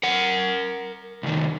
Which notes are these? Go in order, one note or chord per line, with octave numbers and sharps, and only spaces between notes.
A#4 F#5
C2 D#3